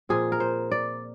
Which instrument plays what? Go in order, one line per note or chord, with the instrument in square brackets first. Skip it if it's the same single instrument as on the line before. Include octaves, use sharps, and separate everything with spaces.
[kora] A#2 F3 C4 G#4
A#4
C5
D5